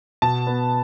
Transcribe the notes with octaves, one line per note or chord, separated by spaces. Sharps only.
B2 A5
B3